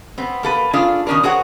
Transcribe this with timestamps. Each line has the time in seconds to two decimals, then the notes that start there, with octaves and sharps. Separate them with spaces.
0.18 B3 C4
0.43 A#3 A4 B4
0.73 C#4 D4 F4 G#4 A4
1.07 B2 D#3 C#4 D4 A#4
1.23 F#4 G#4 A#4 C5 C#5 F#5